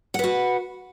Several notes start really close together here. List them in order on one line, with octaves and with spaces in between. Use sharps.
F#5 B4 F#4